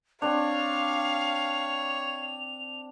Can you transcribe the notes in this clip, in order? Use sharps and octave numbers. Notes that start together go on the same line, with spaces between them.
C4 D4 C#5 F5 F7